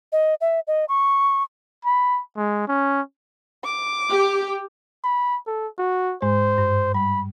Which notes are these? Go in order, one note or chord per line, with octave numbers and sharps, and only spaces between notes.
D#5
E5
D#5
C#6
B5
G#3
C#4
D6
G4
B5
A4
F#4
G#2 G#3 C5
G2
G3 B5